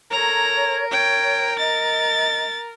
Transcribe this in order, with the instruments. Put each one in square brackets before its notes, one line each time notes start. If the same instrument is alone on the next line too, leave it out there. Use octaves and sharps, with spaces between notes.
[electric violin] A4 A#5 [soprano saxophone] A#4 [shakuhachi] C#5
[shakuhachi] C#5 [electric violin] G5
[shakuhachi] D#5 [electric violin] A6